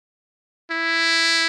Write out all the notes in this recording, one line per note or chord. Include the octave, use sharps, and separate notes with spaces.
E4